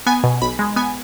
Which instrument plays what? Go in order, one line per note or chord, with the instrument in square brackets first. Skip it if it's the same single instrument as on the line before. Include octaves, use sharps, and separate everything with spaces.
[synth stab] B3 G#5
B2
B1 B5
G#3
B3 G#5